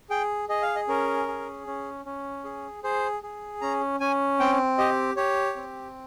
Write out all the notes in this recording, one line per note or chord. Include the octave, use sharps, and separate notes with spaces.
G#4 G5
G#4 D#5
F5
D#5
C#4 A#4
G#4
C#4
C#4
G#4
G#4 C5
G#4
C#4 A#5
C#4 G#5
C4 G5
G4 D#5
G4 C#5
C4